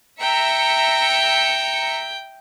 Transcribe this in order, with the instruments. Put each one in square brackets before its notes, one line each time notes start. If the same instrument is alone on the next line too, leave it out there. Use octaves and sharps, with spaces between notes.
[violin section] E5 A#5 C#7 [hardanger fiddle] G5